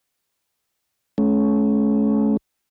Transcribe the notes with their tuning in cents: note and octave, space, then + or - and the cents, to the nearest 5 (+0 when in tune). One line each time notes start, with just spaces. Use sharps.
A3 -45 C#4 +0